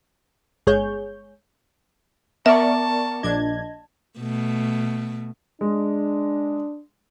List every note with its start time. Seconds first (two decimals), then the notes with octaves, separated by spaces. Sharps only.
0.67 G1 G#3 G#4 C#5 G6
2.46 B3 A#4 D5 E5 A5 C#6
3.23 A#1 D4 D#5 G#6
4.19 B2 A3
5.61 G#3 D4